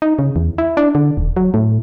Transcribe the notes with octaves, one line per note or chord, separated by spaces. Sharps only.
D#4
C#3
E2
E4
D4
D3
D#1
F#3
A2